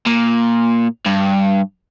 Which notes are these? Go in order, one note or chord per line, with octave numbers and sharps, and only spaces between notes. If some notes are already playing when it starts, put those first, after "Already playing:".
A#2
G2